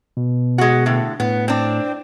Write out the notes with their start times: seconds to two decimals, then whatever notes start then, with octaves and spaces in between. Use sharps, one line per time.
0.17 B2
0.58 G#3 F#4
0.86 A2 D3
1.20 A2 B3
1.48 C4 D4